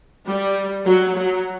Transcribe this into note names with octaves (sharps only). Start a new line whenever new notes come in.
G3
F#3
F#3